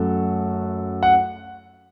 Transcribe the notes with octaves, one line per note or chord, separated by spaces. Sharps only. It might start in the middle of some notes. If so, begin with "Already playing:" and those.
Already playing: F#2 F#3 A3 A4
F#5